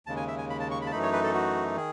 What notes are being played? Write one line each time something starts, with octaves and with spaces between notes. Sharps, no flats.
D#2 C#3 G#3 A5
G#5
E5
G#5
B5
A5
C#6
B5
A5
F#2 E3 A3 D#4 B5
C#5
B4
A4
F#4
D#3 G#4